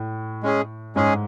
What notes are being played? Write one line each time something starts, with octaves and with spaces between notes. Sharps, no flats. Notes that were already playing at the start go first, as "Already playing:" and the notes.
Already playing: A2
G#3 C#4 G#4
G#2 G#3 C#4 G#4